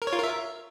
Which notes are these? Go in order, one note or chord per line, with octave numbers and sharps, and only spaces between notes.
A#4
C#5
F4
A#4
E5